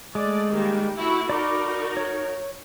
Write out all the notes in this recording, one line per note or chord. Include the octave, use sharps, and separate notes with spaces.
G#3 A3 D5
D#3 G3 A#3
A3 E4 F#4
D#4 F#4 A#4 D5 B5 D6
C#5